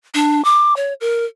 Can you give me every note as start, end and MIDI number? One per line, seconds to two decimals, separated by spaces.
0.14 0.44 62
0.44 0.76 86
0.76 0.93 73
1.01 1.25 70